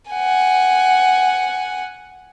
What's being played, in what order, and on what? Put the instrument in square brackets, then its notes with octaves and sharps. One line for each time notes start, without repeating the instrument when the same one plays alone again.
[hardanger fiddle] F#5 G#5